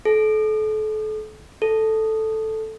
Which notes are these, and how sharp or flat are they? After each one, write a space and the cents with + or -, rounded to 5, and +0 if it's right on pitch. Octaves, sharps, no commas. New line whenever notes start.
A4 -35
A4 +0